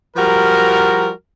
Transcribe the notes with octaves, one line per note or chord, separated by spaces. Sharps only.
F3 G3 F#4 A#4